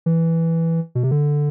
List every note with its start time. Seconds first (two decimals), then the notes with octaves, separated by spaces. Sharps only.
0.06 E3
0.95 B2
1.03 C3
1.11 D3